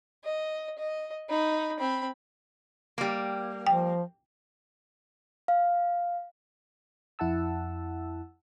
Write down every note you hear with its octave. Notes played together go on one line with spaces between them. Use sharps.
D#5
D#5
D#4 B5
C4 B5
G3 A#3
F3 G5
F5
F2 E4 F#5 A5 E6